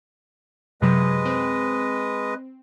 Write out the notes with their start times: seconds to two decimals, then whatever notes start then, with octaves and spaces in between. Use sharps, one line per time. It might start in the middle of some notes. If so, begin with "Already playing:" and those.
0.82 F#2 C3 F#3 G#3 B4 D#5
1.25 C4